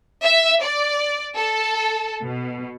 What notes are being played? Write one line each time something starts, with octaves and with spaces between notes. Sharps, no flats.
E5
D5
A4
B2